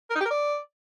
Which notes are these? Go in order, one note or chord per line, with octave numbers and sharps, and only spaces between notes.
A#4
D#4
G4
A#4
D5